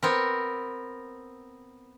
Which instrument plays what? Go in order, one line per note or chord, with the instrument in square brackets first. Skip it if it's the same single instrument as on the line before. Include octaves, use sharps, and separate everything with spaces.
[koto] B3 C4 A#4